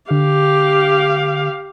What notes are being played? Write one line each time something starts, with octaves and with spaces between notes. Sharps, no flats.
D3 G4 F5